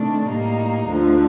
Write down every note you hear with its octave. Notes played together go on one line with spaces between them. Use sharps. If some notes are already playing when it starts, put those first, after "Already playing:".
Already playing: C3 D#3 A3 D4
A2 G3 A#3 D#4
D2 D3 F3